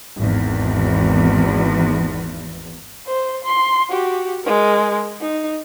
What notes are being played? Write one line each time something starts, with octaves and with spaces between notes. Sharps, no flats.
G#1 E2
C5
C6
F#4 G4
G#3 A#4
D#4